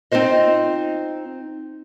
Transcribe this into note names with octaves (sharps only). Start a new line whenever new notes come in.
C4 D#4 F4 C5 D#5